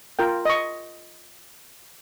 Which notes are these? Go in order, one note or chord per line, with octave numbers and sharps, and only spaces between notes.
F4 A#4 G5
D#5 C#6